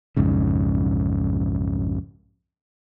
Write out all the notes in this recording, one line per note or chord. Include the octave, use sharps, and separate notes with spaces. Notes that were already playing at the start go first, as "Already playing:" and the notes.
B1 F2 G#2 C#3